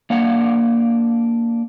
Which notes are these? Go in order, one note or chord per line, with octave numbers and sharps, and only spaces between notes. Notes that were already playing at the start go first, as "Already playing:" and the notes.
A#3 D4 F5 F#5